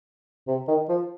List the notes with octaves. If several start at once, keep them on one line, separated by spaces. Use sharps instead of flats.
C3
D#3
F3